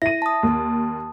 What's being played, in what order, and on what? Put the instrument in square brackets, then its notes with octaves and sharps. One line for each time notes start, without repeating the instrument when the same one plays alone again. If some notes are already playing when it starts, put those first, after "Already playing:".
[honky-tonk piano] E4 D#7 [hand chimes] A#6
[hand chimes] A5 D#6
[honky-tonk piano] D#2